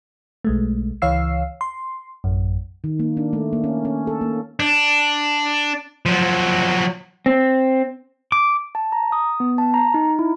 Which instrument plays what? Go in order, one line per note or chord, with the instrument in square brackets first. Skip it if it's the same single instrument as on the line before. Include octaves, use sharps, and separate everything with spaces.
[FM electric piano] B1 G#3 A3
C#2 E3 C#5 F5 E6 C7
C6
A1 F#2
[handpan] D#3
A#3
D4
A3
A#3
C#4
C#4
A4
A#3
[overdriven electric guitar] D4
F3 F#3
[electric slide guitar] C4
[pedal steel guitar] D6
[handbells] A5
A#5
D#6
B3
A5
A#5
D#4
E4